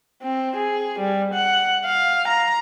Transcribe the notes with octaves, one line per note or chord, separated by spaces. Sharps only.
C4
G#4
G3
F#5
F5
A#5